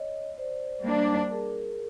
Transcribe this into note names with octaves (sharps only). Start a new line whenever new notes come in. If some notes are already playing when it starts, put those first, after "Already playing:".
Already playing: C#5 D#5
C5 D5
G3 A#3 D4
G#4 A#4